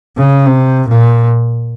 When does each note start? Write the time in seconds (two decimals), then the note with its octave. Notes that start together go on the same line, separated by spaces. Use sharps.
0.17 C#3
0.46 C3
0.88 A#2